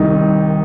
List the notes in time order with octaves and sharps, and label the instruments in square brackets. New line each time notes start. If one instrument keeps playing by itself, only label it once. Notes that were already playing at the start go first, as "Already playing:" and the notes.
Already playing: [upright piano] C2 D#3 D#4